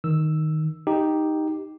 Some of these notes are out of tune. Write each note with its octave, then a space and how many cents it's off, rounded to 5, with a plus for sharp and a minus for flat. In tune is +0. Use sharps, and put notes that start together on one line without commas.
D#3 +0 E6 +0
D#4 +0 G4 +0